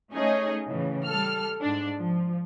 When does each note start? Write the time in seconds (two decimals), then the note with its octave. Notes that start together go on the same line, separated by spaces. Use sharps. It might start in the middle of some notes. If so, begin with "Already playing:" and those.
0.12 A3 C#4 D#4 G#4 C#5 D#5
0.68 A2 C#3 E3
1.05 G3 A4 F6
1.62 G#2 D4
1.98 F3